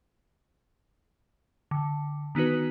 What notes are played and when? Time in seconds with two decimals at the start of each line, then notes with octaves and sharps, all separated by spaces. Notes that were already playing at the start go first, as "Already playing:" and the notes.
1.71 D3
2.35 D#3 B3 D#4 F#4 B4